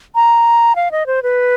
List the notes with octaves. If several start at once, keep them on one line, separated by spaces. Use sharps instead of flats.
A#5
F5
D#5
C5
B4